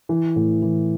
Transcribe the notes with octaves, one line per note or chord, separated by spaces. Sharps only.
E3
A2
E3